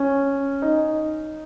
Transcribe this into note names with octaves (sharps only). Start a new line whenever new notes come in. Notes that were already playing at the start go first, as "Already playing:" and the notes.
Already playing: C#4
D#4